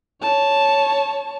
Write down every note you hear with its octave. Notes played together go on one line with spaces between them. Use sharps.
C#5 A5